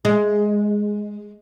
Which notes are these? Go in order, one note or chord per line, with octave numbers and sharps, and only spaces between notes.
G#3